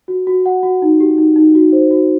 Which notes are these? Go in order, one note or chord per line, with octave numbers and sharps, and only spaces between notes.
F#4
F#4
F#5
F#4
D#4
G4
D#4
D#4
F#4
C5
F#4